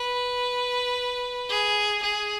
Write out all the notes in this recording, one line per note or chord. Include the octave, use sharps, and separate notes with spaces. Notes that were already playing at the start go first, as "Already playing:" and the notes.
Already playing: B4
G#4
G#4